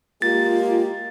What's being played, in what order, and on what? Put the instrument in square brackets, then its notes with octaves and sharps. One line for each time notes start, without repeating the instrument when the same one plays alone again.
[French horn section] G#3 A#3 G4 [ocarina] F4 [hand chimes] A6